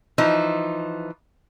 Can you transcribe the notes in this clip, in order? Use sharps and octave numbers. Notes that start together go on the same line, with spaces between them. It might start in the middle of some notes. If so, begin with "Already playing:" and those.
E3 F3 D#4